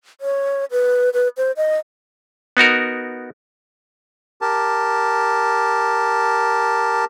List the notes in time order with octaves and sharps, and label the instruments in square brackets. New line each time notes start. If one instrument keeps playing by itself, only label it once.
[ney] C#5
B4
B4
C5
D#5
[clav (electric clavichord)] B3 D#4 F#4 A#4
[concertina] G4 A#4 A5